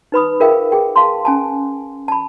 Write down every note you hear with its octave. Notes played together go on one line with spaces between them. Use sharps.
D#4 B4 B5 D#6
F4 G#4 A#4 E5 F5 G5
G#4 G5
F5 A5 C6
C#4 G#5 A5
A5 B5